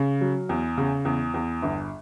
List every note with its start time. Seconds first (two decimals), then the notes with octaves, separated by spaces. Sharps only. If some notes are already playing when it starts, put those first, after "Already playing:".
Already playing: C#3
0.21 F#3
0.49 E2
0.78 C#3
1.05 E2
1.34 E2
1.63 G1